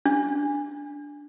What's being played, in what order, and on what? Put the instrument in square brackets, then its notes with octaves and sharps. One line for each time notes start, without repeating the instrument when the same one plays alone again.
[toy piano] D4